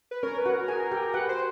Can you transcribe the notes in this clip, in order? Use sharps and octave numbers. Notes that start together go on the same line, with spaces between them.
B4
C#4 A#4 C#5
B4
F#4 F#5
A#4
G#4 G#5
G4 G5
F#4 B4 F#5
C5